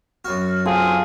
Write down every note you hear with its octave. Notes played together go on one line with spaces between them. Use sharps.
F#2 F#4 F6
C4 F4 G#4 A4 F5